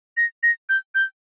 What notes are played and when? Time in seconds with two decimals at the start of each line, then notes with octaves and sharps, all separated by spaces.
0.17 A#6
0.43 A#6
0.69 G6
0.95 G6